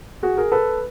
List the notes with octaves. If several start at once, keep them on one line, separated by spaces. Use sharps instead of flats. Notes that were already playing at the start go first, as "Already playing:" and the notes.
F#4 G#4
G#4 A#4
A4 B4